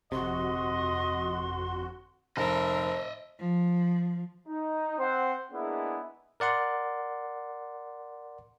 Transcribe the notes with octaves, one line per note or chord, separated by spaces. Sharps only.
G1 F2 C3 F#4 D#5 C6
F1 A#4 C5 D#5 E5
F3
D#4
C4 C5 F#5
G#3 A#3 B3 D4 E4 G#4
A#4 D5 F#5 C6